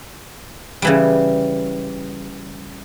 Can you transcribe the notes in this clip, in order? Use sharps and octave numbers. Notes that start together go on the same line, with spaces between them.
C#3 E3 G3